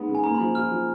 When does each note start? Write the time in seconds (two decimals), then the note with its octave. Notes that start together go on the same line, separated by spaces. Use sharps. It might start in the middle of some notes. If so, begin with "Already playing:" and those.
Already playing: G#3 B3 D#4
0.09 C#3
0.15 G#5
0.24 A#3 A#5
0.35 B5
0.40 F3
0.55 F4 F6
0.72 F3